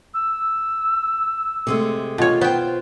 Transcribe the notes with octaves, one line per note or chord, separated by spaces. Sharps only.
E6
C3 G#3 A3
B2 F4 C#5
B3 C5 G5